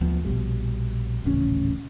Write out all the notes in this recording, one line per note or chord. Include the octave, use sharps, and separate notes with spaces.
D2 F3 B3
A#1 B2 G3
D#1 A1 C#3 C#4